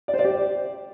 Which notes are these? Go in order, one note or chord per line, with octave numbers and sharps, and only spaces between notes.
D5
C5
D5
G4